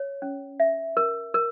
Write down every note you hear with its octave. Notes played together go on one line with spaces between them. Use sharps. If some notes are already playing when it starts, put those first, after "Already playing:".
Already playing: C#5
C#4
E5
A#4
A#4